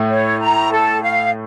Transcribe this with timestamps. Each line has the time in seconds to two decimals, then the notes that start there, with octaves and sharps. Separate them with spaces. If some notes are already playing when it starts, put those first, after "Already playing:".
Already playing: A2 A3
0.10 C#5
0.41 A#5
0.72 A4
1.03 F5